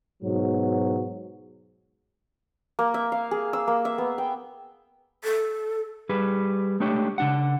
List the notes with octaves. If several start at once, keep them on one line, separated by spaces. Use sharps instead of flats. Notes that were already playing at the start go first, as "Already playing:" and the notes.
G#2 B2 F#3
A#3
E5
F5
G#4
E6
A#3
E5
B3
G5
A4
G3 G#4 B4
G#3 A3 D4 G4 C#5
C#3 D4 F#5